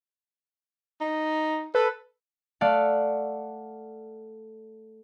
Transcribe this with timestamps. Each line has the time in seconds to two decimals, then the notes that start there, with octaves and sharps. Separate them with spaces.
1.00 D#4
1.75 A4 B4
2.61 A3 A4 D5 F5 F#5